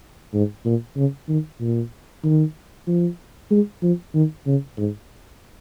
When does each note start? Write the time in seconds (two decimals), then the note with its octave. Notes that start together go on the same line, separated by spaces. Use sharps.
0.34 G#2
0.65 A#2
0.96 C#3
1.29 D#3
1.61 A#2
2.24 D#3
2.88 F3
3.51 G#3
3.83 F3
4.14 D#3
4.46 C#3
4.78 G#2